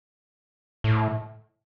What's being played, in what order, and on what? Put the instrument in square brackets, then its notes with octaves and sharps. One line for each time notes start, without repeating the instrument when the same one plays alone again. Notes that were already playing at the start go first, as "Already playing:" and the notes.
[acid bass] A2